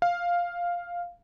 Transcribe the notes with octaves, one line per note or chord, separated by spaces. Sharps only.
F5